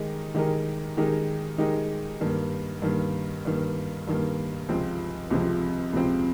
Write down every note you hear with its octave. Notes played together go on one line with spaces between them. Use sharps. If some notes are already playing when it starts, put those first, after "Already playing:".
Already playing: D#3 G#3 D#4 G4 A#4
D#3 G#3 D#4 G4 A#4
D#3 G#3 D#4 G4 A#4
D#3 G#3 D#4 G4 A#4
G2 D#3 A#3
G2 D#3 A#3
G2 D#3 A#3
G2 D#3 A#3
C#2 C3 F3 C4
C#2 C3 F3 C4
C#2 C3 F3 C4